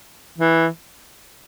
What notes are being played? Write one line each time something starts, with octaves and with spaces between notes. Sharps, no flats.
E3